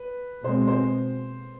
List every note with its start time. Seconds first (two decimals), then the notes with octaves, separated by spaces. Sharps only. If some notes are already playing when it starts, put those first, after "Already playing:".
Already playing: B4
0.44 B2 G#3 C4 C5
0.67 C5